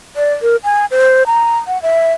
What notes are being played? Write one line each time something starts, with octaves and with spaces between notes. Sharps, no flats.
D5
A#4
G#5
C5
A#5
F#5
E5